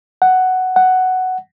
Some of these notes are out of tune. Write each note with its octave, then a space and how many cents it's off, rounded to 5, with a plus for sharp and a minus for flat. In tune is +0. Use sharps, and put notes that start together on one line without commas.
F#5 +5
F#5 +5